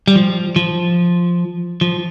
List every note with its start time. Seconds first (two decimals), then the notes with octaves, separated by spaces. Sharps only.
0.08 G3
0.16 F3
0.56 F3
1.81 F3